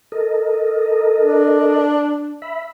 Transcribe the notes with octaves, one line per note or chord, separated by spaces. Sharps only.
A4 A#4 D#5
D4
E5 B5